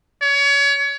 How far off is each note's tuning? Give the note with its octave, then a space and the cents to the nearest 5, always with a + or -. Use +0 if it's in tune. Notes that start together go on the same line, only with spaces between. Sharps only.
C#5 +30